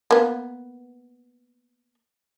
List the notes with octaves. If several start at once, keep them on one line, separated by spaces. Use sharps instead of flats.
A#3 B3